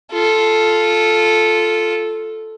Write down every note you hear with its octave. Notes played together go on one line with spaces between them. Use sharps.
F4 A4